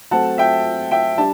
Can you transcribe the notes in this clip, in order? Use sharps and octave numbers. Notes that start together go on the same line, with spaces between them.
F#3 A3 C4 F#5 A5
E5 G5
E5 G5
G3 D4 A5